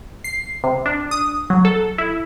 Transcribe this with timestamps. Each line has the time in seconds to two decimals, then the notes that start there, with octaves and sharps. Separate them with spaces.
0.24 C7
0.64 C3
0.86 D4
1.11 D#6
1.50 F#3
1.65 A4
1.98 E4